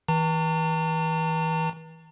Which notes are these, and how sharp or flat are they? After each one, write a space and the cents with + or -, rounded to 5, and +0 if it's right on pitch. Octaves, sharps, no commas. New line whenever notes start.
E3 -40 A#5 -45